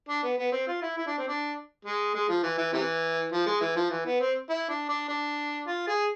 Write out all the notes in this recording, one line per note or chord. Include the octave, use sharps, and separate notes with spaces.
D4
B3
B3
C4
F4
E4
E4
D4
C4
D4
G#3
G#3
F3
E3
E3
C3 E3
F3
G#3
E3
F3
E3
B3
C4
E4
D4
D4
D4
F4
G#4